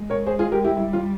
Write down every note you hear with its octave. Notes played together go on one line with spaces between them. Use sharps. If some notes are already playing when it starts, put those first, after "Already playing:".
Already playing: G#3
A#4 C#5
G#4 C5
F4 G#4
G4 A#4
E4 G4
G3 E4
F4